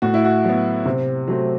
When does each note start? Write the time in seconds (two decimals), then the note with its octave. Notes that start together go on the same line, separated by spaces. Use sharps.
0.02 A2 F#4
0.14 E4
0.25 F#4
0.45 F#3 B3
0.86 C3
1.28 F#3 A3 C4